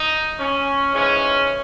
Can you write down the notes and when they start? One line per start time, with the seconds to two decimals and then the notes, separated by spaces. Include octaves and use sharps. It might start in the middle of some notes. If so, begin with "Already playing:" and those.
Already playing: D#4
0.39 C#4
0.94 G#2 E3 G#3 C#4